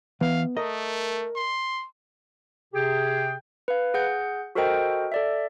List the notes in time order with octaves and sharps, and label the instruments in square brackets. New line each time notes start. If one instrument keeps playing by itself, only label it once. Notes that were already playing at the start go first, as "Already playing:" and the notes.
[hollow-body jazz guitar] E3 [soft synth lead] B3 [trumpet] F5
[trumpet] A3 [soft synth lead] A#4 [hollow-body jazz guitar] D#5
[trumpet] C6
[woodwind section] C3 G4 G#4 G5
[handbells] B4 F5
G#4 F#5 G6
F#4 A4 A#4 C5 D#5 G5
A4 D5 E5